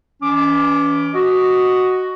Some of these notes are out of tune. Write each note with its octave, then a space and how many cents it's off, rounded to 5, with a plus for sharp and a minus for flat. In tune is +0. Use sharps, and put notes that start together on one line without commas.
E3 +0 C#4 +35 D6 +0
F#4 +5 D#5 +0